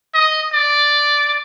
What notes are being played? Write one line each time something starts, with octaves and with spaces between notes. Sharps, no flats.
D#5
D5